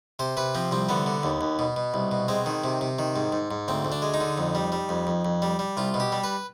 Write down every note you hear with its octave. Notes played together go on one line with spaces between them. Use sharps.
C3 C5
C3 B4
F3 C4
C2 C4
D3 B3
D3
D#2
D#2
B2
B2
C2
B2
G#3 C4
D#3
C3
C3
D#3
G#2
G#2
G#2
D2 C4
D2
D4
G#3
D#4
D3
F2
G3
G3
F2
F2
F2
G3
G3
C2 F4
B2
G4
G3
B4